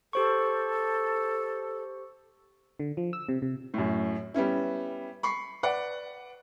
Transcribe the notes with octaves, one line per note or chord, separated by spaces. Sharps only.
G4 A4 C5 C#6
D3
F3
E6
C3
C3
F#2 A2
G3 B3 C#4 E4
B5 C#6 C7
B4 D5 F#5